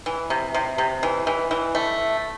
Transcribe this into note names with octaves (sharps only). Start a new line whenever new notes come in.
E3
C3
C3
C3
E3
E3
E3
A3